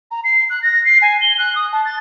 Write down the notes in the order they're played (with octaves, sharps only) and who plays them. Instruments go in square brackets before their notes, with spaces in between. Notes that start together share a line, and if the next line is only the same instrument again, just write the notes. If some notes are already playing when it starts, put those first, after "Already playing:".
[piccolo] A#5
C7
F#6
A#6
C7
G#5
G7
F#6
D#6
A5
A6